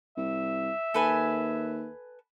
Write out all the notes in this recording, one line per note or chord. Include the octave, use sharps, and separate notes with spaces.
C2 E5
D#2 A4 B4 G#5